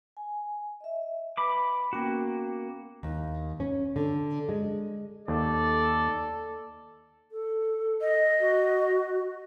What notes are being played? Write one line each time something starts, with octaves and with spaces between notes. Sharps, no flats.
G#5
D#5 E5
B4 B5 D6
A#3 B3 C#4 F#4 G5
D#2
C#4
D3
G#3
D#2 A4 D5
A4
D#5
F#4